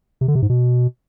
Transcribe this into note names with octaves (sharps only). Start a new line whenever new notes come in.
C3
D3
C3
G#2
B2